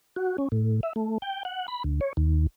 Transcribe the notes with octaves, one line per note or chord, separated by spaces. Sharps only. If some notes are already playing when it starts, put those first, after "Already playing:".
F#4
C#4
A2
E5
A3
G5
F#5
B5
D2
C#5
D#2